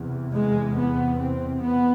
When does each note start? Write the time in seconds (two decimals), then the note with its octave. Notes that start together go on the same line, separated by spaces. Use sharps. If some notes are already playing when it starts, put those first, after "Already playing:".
Already playing: E2 C3
0.34 G#3
0.77 B3
1.19 C4
1.62 B3